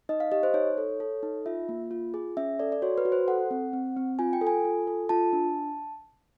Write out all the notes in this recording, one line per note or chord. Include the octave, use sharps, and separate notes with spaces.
D#4 D#5
F5
G4 D#5
C5
D#4 C#5
A4
A4
D#4
F4 E5
A#3
F4
G#4
C#4 E5
A4 D5
D5
F#4 C#5
B4
F#4
C5
A4 F#5
C4
C4
C4
F4 G#5
G5
A4
G#5
F4
A4
F4 A5
D4